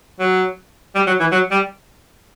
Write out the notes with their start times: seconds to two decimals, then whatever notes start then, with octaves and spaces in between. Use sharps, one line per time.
0.20 F#3
0.95 G3
1.07 F#3
1.20 E3
1.32 F#3
1.52 G3